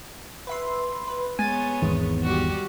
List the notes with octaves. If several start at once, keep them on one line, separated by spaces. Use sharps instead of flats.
B4 E5 C6
B4
G#3 B3 C#5 G#5 A6 D#7
G#1 E2 D#3 G#3
G3 F#4 G4